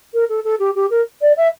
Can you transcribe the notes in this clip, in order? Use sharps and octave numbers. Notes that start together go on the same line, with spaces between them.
A#4
A4
A4
G4
G4
A#4
D5
E5